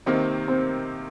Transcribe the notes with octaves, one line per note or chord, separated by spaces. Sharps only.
C3 D#3 A#3 C4
C4